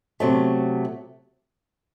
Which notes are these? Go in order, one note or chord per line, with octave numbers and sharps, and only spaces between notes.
C3 F#3 A3